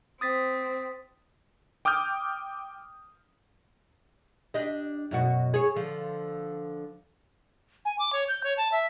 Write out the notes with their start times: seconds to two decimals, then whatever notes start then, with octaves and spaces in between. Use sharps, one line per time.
0.21 C4 D#6 A6 B6
1.85 G5 D6 D#6 F6 G6
4.54 D4 G4 D#5
5.11 F#2 B2 F#4
5.54 G#4 C#5
5.76 D3 F3
7.85 G#5
7.99 D6
8.13 C#5
8.28 G6
8.44 C#5
8.58 A5
8.72 E5